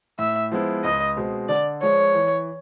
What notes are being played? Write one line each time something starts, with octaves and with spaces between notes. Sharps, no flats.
A2 E5
F3 G#3 B3 E4
C#2 D#5
B2 G#3 C4
D3 D5
F3 G#3 C#5
E3